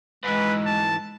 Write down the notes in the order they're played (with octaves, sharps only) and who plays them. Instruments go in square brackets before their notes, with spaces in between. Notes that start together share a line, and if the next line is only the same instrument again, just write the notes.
[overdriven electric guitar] G#2 E3 [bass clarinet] G#3 [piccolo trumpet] B4
[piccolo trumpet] A5